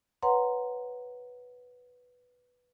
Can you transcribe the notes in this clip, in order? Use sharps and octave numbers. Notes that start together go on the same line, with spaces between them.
B4 C#5 F#5 A#5 C6